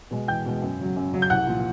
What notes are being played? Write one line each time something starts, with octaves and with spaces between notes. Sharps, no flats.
B2 G#3
E2 G5 G6
B2 G#3
F#2
C#3 F#3
F#2
C#3 F#3
G6
C2 F#5 F#6
A#2 F3